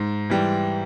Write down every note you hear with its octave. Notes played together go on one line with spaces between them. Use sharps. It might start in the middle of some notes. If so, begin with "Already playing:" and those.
Already playing: G#2
E3 G3